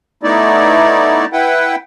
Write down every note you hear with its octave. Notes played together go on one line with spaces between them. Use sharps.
A3 B3 D#4 E4 D5
E4 B4 F#5 G5